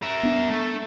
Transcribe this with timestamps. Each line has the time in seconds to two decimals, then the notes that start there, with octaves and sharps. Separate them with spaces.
0.03 A#4 E5
0.23 B3 D4
0.50 A3